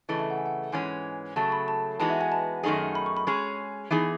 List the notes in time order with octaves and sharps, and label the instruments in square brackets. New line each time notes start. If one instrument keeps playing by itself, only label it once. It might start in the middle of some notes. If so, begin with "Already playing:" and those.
[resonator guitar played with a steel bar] C#3 E3 A3 [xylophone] D#5
[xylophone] E5
F#5
G#5
F#5
[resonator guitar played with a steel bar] G#2 E3 G#3 C#4 [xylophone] G#5
[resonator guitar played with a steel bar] C#3 F#3 A3 [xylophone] A5
[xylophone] B5
A5
[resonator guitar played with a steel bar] E3 G#3 B3 D#4 F#4 [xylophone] A5
[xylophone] E5
G#5
A5
[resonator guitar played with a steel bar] F#2 D#3 A3 D#4 G#4
[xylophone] B5
C#6
B5
[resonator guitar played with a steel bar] G#3 C#4 G#4 [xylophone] C#6
[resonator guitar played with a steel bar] E3 B3 D#4 G#4